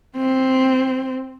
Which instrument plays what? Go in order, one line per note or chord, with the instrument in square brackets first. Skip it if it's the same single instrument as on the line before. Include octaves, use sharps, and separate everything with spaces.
[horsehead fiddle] C4